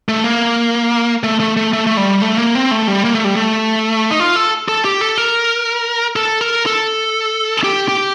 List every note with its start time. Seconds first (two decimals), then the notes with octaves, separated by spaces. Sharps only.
0.09 A3
0.24 A#3
1.23 A3
1.40 A3
1.57 A3
1.73 A3
1.87 A3
1.97 G3
2.22 A3
2.38 A#3
2.55 C4
2.71 A3
2.87 G3
3.04 A#3
3.15 A3
3.25 G3
3.35 A3
4.11 D#4
4.20 F4
4.36 A4
4.68 A4
4.85 G4
5.01 A4
5.18 A#4
6.16 A4
6.41 A#4
6.66 A4
7.64 G4
7.88 G4